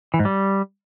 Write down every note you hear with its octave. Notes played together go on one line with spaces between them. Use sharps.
E3
G#2
G3